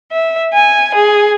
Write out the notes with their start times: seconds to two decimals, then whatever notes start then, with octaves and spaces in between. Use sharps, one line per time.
0.12 E5
0.52 G#5
0.93 G#4